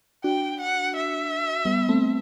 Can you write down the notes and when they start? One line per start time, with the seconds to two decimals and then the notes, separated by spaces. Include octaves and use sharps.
0.24 D4 F#4 G5
0.60 F#5
0.96 E5
1.65 G3 B3
1.89 A3 C4